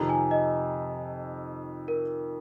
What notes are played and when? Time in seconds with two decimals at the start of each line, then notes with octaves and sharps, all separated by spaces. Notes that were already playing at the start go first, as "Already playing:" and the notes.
Already playing: F2 C3 D#3 A#5
0.09 G#5
0.31 D#5
1.88 A#4